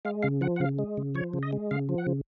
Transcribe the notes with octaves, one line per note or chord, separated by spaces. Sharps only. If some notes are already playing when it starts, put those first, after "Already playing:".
G#3 F5
C#3 F5
F3 F#5
F#5
C#3 F5
G#3
C#3
F3 C#5
C#3
D#5
G#3
C#3 F5
F3
F#5
C#3